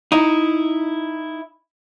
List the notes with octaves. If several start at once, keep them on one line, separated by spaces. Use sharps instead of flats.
D#4 E4